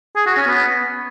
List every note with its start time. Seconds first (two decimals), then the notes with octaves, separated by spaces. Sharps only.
0.16 G#4
0.26 F#4
0.37 C#4
0.47 B3